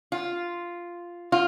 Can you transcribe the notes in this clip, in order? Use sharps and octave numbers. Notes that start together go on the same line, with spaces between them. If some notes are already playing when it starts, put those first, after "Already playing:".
F4
F4